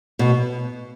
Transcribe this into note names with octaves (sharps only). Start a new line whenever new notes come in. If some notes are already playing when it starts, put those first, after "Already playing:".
B2